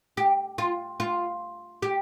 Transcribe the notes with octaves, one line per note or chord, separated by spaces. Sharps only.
G4
F4
F4
G4